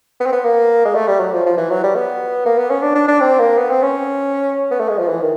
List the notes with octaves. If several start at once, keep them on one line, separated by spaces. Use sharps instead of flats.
B3
C4
B3
A#3
G#3
A3
G3
F#3
F3
F3
E3
F#3
G3
B3
A#3
B3
C#4
D4
D4
D4
C4
A#3
B3
C4
C#4
B3
A3
G#3
F3
E3
D#3